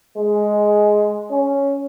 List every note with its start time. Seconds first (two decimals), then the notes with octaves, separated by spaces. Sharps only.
0.17 G#3
1.31 C#4